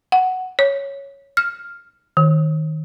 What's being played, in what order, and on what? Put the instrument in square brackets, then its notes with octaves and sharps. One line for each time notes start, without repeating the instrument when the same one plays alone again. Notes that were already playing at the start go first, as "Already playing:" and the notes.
[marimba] F#5
C#5
F6
D#3